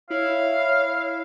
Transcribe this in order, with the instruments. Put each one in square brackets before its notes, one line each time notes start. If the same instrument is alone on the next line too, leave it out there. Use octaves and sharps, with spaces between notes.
[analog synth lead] E4 [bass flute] C#5 [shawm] F5